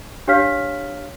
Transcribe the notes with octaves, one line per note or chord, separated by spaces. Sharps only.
D4 G4 C#5 F5 F6 B6